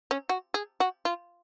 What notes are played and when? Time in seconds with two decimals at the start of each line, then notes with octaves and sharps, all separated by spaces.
0.11 C#4
0.29 F#4
0.54 G#4
0.80 F#4
1.05 F4